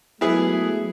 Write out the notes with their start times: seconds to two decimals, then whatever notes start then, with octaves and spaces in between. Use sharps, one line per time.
0.21 F#3 G#3 A3 B3 E4 G#4